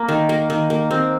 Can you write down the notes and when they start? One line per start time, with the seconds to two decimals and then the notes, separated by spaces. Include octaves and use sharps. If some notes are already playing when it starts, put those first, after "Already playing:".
Already playing: A#3
0.08 D#3
0.29 A#3
0.50 D#3
0.70 A#3
0.91 A#3 C4